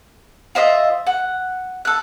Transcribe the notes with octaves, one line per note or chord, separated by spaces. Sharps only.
F4 C5 D#5 E5
F#5
A4 F#6